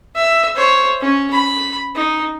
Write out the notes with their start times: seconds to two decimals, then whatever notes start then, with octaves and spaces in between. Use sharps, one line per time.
0.15 E5
0.55 C5 C#5
1.01 C#4
1.31 B5
1.95 D#4